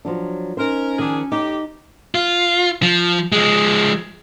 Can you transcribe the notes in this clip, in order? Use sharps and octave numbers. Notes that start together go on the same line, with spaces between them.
F3 F#3 D4
C#4 D#4 A#4 C5
D#3 F3 D4 G#4
A2 D#4 G4
F4
F3
F3 G#3